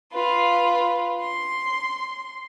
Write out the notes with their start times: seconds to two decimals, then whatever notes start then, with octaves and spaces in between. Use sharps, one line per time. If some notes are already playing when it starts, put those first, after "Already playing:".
0.13 F4 B4
1.21 C6